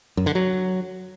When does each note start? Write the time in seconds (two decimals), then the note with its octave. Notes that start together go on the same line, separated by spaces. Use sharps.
0.17 F#2
0.26 D3
0.35 F#3